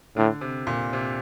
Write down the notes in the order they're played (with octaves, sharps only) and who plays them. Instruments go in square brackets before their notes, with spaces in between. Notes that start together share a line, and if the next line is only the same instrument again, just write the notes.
[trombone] A2 [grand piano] D3
[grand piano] C3
A#2
C3